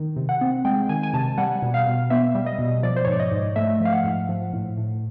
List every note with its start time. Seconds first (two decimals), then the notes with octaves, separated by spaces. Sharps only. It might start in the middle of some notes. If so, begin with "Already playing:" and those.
Already playing: D#3
0.16 C3
0.29 F#5
0.41 C4
0.65 G#3 G5
0.89 D#3 G#5
1.03 G#5
1.14 C3 A5
1.38 G3 F#5
1.62 B2
1.74 F5
1.86 B2
2.10 B3 E5
2.35 G3
2.46 D#5
2.59 B2
2.83 F3 D5
2.96 C5
3.05 G#2 C#5
3.12 D5
3.20 D#5
3.32 G#2
3.56 A3 E5
3.80 F3 F5
3.93 F#5
4.04 G#2
4.29 F3
4.53 A2
4.77 A2